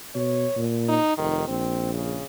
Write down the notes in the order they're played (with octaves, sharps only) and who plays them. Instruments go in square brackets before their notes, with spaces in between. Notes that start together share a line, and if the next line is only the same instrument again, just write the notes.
[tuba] B2 [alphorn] C#5
[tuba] A#2
[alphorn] D#4
[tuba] F1 [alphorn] D#3
[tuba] A#1 [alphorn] C4
[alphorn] C#3